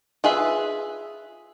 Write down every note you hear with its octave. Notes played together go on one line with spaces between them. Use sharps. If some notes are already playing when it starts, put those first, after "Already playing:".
F4 G#4 B4 E5